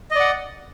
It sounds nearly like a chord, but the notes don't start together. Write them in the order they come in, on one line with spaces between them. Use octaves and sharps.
D#5 D5 F#5